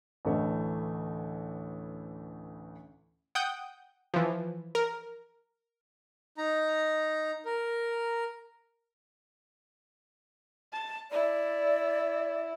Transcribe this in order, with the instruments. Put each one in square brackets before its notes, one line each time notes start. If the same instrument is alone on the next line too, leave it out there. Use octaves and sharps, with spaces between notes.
[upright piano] A1 D2 E3 A3
[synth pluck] F#5 G5 D#6 G6
E3 F3
A#4
[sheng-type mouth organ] D#4 A#5
A#4
[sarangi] A5
[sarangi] E4 [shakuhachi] D5